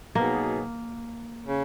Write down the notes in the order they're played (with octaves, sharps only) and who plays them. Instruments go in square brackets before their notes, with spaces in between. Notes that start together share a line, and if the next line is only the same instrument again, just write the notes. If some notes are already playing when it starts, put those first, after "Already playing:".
[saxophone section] B2 F#3 B3 D#4 G#4 [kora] A#3
[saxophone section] C#3